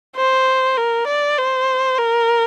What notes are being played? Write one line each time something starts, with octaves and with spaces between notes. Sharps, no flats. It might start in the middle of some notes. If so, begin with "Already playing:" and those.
C5
A#4
D5
C5
A#4